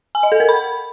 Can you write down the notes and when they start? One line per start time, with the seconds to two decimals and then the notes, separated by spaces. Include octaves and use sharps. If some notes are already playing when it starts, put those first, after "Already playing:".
0.15 G#5
0.23 D#5
0.32 A4
0.40 A#4
0.49 B5